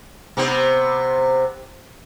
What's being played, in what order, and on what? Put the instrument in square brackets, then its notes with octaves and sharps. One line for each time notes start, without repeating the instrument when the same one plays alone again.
[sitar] C3 B3 C5